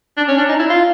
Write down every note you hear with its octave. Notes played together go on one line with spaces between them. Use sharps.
D4
C#4
D4
D#4
E4
F4